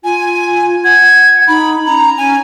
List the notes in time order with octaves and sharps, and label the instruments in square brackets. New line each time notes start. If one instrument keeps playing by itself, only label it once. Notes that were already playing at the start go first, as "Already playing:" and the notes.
[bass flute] F4 [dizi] G#5
[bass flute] F#5 [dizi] G#6
[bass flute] D#4 [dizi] B5
[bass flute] C#4 [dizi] A#5
[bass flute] C#4 [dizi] G#5